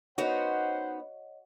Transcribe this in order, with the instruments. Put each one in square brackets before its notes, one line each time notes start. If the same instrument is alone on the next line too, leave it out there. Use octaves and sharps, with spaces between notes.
[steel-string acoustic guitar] B3 C#4 D#4 [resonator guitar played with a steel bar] F#4 [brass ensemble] C5 F#5 [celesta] C#5 D#5